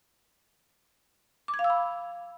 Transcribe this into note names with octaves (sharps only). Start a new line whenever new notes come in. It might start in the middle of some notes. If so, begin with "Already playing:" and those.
D6
G#6
F5
E6
B5